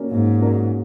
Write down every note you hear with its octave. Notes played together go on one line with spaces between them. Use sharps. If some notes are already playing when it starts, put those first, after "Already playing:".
Already playing: A#3 C#4 F#4 A#4 D5
G#2 A#3
C#4 F#4 A#4 D5